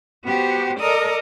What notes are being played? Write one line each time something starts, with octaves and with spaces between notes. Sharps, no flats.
B3 F#4 G4 C5
A4 A#4 D5 D#5 A#5 D#6